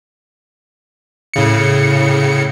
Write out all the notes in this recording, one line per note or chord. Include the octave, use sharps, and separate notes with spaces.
A2 C#3 C#7